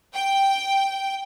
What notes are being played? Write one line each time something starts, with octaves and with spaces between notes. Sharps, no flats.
G5